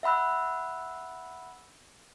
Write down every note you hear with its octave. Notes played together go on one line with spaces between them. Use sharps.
E5 F#5 B5 E6 F#6